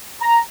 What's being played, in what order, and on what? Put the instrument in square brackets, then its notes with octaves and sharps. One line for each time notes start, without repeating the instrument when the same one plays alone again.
[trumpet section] A#5